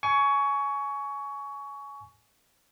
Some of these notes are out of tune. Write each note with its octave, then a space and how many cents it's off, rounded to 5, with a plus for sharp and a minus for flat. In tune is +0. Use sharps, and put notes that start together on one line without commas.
G#5 +20 C#6 +20